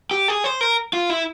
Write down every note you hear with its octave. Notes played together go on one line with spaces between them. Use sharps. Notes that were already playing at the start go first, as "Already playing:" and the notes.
G4
G#4
C5
A#4
F4
E4